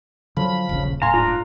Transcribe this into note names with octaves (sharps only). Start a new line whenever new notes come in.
D3 F3 F#3 B5
D#1 A#1 C#3
D1 A2 F5 G#5 A#5 C6
G#2 D4 F4